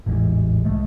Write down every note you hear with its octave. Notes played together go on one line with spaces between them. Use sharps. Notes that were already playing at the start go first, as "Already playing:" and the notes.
A1 E2 G#2 E3
C2 C3 G#3 A3